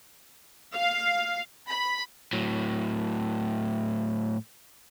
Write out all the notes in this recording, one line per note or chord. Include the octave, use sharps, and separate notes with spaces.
F5
B5
A2 F#3